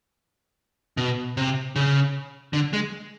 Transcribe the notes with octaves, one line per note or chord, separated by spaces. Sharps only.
B2
C3
C#3
D3
G#3